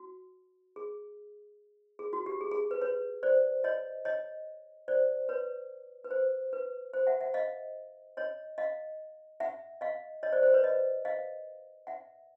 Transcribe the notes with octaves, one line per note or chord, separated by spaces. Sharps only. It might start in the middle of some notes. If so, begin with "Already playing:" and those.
Already playing: F#4
G#4
G#4
F#4
G4
G#4
G#4
B4
B4 C#5
C5 D5
C#5 D#5
C#5 D#5
C5 D5
B4 C#5
B4
C5
B4
C5
E5 F#5
E5 F#5
D#5 F5
C#5 D#5
D#5 F5
E5 F#5
D#5 F5
C#5 D#5
C5 D5
C5
B4 C#5
C#5 D#5
D#5 F5
E5 F#5